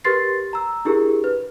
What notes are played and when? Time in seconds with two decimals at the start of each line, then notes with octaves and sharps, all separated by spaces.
0.04 G4 A#4 B4 C6 A6 C7
0.53 A#5 E6
0.85 D4 E4 G4 G#4 A#4
1.24 B4